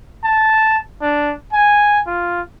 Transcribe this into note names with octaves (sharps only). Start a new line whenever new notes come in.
A5
D4
G#5
F4